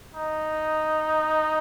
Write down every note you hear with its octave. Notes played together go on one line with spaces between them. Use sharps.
D#4